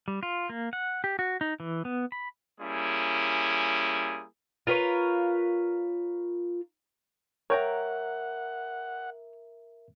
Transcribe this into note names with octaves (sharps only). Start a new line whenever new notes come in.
G3
F4
A#3
F#5
G4
F#4
D#4
E3
B3
B5
G3 A#3 C#4 E4 G#4
F4 A#4 B4 C#5
A#4 C#5 E5 F#5 G5 A#5